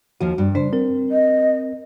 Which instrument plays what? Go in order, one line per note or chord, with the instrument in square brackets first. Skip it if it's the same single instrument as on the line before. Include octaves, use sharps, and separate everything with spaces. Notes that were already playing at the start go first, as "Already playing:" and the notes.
[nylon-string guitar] D#2 F3 [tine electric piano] F#4
[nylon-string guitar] G2
[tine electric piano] C#3 D4 [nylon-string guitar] C5
[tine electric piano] C4 A#4
[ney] D#5